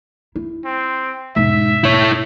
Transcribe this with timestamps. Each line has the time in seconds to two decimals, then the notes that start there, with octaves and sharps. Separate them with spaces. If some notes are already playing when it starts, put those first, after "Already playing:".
0.36 E4
0.65 C4
1.36 E1 G#2 E5
1.84 E1 E4 C#5